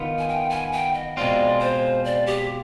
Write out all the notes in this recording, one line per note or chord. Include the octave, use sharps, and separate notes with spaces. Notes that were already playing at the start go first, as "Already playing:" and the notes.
Already playing: D#3 B3 F4
G#5
G5
G#5
G5
D#5
B2 G#3 C4 F4 D5
C5
D5
G4